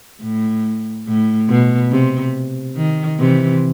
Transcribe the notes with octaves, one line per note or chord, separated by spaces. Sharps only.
A2
A2
B2
C3
D#3
C3 E3